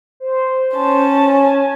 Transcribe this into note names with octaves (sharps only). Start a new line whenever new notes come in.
C5
C#4 A5
G#5